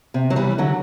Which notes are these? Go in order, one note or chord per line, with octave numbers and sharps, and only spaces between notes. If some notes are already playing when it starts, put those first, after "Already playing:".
C3
F#3
E3 G3
D3 F#3